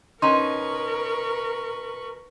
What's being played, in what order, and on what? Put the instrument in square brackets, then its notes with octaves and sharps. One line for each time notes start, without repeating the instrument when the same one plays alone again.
[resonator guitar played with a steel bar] B2 C#4 D#4 [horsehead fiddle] A#4 [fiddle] B4 C#6 [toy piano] C6